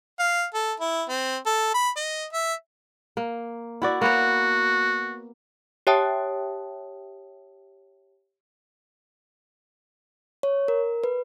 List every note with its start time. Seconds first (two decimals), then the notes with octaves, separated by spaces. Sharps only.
0.20 F5
0.54 A4
0.80 E4
1.09 C4
1.46 A4
1.74 B5
1.97 D#5
2.33 E5
3.17 A#3
3.82 E4 F#4 D5
4.01 A#3 B3 F#4 C#5
5.87 G4 C#5 E5 G5 A5 D#6
10.43 C#5
10.68 A#4
11.04 B4